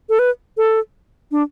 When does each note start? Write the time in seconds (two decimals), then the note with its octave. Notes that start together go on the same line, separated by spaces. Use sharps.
0.09 A4
0.19 B4
0.57 A4
1.31 D4